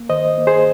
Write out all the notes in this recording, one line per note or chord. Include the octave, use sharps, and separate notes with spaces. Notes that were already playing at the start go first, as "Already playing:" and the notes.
Already playing: A#3
D#3 C5 D#5
A#3
G#4 C5